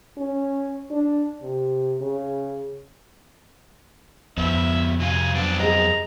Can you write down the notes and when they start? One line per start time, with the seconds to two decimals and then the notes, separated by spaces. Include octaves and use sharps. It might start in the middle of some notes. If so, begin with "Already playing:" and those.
0.17 C#4
0.91 D4
1.42 C3
2.01 C#3
4.38 F2 F3 B3 E5
5.00 C3 F#4 F5 G#5
5.34 F#2 B3 C4 D4
5.60 G#4 D#5 A#5